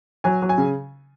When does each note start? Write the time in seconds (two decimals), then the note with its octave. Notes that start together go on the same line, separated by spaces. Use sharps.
0.24 F#3 G#5
0.42 F#3
0.49 G#5
0.58 C#3